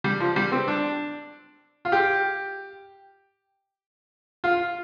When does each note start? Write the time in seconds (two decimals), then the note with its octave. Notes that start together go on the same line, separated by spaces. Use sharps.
0.04 G3
0.20 F3
0.36 G3
0.52 C4
0.68 D4
1.85 F4
1.92 G4
4.44 F4